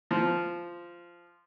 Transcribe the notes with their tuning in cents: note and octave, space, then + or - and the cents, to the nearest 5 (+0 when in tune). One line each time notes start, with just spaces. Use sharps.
F3 -10